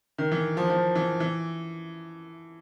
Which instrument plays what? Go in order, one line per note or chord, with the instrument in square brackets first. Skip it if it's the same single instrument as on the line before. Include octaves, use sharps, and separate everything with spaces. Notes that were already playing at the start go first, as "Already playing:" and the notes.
[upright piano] D#3
E3
F3
F3
E3
E3